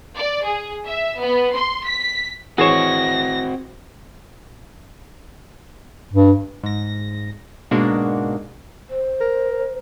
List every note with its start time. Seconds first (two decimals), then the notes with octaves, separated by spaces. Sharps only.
0.16 D5
0.45 G#4
0.86 E5
1.19 B3
1.54 C6
1.86 B6
2.58 E3 C4 F#4 G#4 C#5 A#6 C7 E7
6.13 G2
6.63 G#2 A#6
7.71 G#2 B2 G#3 A#3 D4 F#4
8.90 C5
9.21 A#4